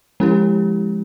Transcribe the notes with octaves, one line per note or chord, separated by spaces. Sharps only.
F3 G#3 C#4 E4 G4